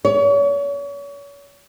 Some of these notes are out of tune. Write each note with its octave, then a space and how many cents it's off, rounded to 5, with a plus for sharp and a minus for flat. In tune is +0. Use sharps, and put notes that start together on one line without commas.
C#5 +35